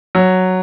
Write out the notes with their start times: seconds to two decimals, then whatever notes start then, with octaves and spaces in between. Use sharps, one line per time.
0.15 F#3